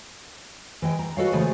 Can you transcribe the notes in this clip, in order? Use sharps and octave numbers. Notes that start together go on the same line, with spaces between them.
E3 G#3 G5
A#5
F#4 A4 B4 C#5 D#5 F5
C#3 E3 F3 G#3 A3